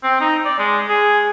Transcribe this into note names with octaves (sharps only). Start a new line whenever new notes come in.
C4
D#4
D5
G#3
G#4